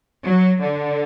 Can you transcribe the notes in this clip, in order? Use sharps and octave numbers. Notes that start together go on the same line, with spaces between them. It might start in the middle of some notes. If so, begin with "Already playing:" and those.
F#3
D3